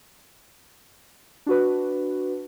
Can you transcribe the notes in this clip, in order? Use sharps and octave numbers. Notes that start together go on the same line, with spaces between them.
D4 F#4 B4